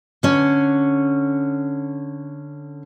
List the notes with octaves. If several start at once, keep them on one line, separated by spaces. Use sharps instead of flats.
D3 C#4